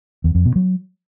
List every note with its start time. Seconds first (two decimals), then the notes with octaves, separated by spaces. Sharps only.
0.24 E2
0.35 F2
0.45 B2
0.56 F#3